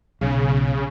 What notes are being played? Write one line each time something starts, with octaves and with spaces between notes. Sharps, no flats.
B1 C#3